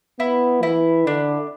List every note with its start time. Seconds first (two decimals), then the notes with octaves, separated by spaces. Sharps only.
0.20 B3 E4
0.63 E3 E4
1.06 D3 D4